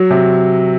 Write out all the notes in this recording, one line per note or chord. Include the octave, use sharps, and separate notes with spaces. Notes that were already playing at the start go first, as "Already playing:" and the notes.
Already playing: F#3
C3